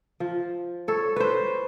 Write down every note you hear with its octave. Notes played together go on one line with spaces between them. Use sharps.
F3
A4 C#5
B4 C5